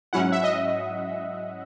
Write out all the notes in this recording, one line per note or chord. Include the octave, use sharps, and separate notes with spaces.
G#2 F#3 C#4 E4 F#5
E5
D#5